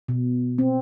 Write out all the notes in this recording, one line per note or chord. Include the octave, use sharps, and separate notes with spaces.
B2
C4